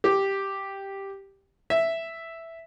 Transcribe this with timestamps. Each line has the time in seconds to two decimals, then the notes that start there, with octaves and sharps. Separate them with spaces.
0.04 G4
1.70 E5